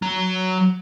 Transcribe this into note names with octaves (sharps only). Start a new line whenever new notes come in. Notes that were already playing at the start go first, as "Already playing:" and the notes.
F#3 A#5